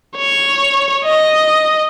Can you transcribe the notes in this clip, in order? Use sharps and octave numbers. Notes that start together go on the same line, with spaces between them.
C#5
D#5